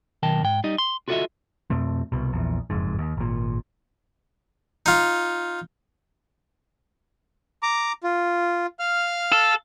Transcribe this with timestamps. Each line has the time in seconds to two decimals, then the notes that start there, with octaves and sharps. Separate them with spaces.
0.23 B1 D#3 A#4 G5 A5
0.43 G#2 G5
0.64 G3 D#4 D#5
0.78 C6
1.08 F4 F#4 A4 C#5 D#5 E5
1.70 F2 B2 A3 C4
2.12 C2 B2
2.33 A#1 E2
2.70 F#1 F2 G#2
2.99 D#2
3.17 G#1 A#2
4.86 D#4 F4
7.63 A#5 D6
8.03 F4
8.79 F5 F6
9.32 A4